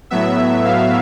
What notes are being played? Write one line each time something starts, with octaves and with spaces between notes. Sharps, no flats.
A2 F#3 B3 E5
F5